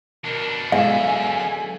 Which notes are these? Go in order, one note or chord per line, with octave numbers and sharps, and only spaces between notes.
B2 D4 A#4
F#2 D3 G#3 B3 E5 F5 G#5